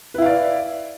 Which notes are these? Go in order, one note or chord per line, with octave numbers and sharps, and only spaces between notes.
E4 B4 D5 F5